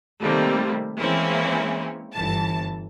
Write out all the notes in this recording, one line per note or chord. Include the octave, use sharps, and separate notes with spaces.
C3 D#3 G3 A3 A#3 C4
E3 G#3 A#3 C4 C#4 E4
G1 E3 A5